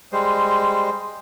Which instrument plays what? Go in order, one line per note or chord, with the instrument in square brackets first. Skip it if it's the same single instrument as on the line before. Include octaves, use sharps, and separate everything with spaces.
[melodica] G3 G#3 C5